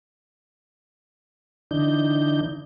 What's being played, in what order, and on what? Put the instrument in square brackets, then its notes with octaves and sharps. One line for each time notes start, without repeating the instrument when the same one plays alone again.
[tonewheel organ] D3 E3 D4 D#4 G6